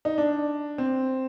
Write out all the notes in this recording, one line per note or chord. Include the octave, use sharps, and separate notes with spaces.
D#4
D4
C4